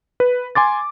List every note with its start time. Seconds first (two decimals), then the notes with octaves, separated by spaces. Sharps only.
0.20 B4
0.55 G#5 C6 D6 A6